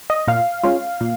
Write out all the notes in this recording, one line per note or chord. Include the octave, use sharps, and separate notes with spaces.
D#5
A#2 F5
G#3 C#4 F4
A#2